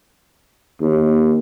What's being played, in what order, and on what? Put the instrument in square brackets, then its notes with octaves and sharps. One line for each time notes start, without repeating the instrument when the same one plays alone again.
[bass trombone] D#2